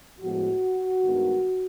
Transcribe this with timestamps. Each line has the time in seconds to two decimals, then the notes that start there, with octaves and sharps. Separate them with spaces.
0.20 A2 F3 G#3 B3 F#4
1.04 G2 D#3 G#3 B3